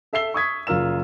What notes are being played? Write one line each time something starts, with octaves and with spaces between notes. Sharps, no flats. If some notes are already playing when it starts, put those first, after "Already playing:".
A4 E5 E6 C7 G7
C#6 D#6 G#6 B6
F#1 F4 A#4 E6 E7